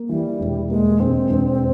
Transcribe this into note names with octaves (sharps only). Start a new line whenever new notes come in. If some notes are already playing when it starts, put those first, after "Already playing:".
Already playing: A#3
E3 G3
E1
G#3 A#3
E1 C4
E1